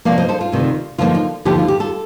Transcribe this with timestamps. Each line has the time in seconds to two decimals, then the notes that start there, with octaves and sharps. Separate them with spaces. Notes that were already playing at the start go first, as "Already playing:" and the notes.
0.05 C3 F3 A#3 D5 F5
0.18 C5 D#5
0.29 A4 C5
0.41 F4
0.52 D2 C3 D#3
0.98 D3 F3 A#3 D#4 F4
1.15 F4
1.45 D#2 D3 F3 G4
1.58 F4
1.68 G4
1.80 F4 A4